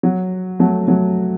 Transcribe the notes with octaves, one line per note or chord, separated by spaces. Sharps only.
F#3
F#3 A3
F#3 A3